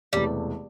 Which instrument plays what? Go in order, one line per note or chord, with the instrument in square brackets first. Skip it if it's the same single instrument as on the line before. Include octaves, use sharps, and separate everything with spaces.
[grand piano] E1 C3 E3 A3 [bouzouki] G3